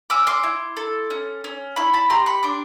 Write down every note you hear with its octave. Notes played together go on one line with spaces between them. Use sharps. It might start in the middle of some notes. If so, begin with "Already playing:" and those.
C#4 D6 E6
C6 D6
E4
A4
C#4
C#4
E4 B5 C#6
A5 B5
G4 A#5 C6
B5 C#6
D4 C6 D6